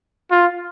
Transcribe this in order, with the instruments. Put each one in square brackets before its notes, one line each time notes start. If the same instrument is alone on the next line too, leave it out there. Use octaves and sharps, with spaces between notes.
[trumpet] F4